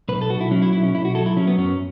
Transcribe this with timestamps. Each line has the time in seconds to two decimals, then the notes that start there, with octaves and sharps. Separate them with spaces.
0.09 B1 B4
0.21 A4
0.30 B1 F#4
0.41 E4
0.51 F#3 C#4
0.62 E4
0.73 B1 E4
0.83 C#4
0.94 B1 E4
1.05 F#4
1.15 F#3 A4
1.26 E4
1.37 F#3 C#4
1.47 B3
1.58 F#2 C#4